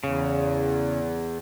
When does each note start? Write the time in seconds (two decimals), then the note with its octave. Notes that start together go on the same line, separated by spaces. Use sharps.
0.04 E2 C#3